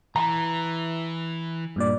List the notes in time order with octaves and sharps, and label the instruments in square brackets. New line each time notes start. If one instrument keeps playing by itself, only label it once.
[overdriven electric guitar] E3 [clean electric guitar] A#5
[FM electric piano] G2 A#2 D5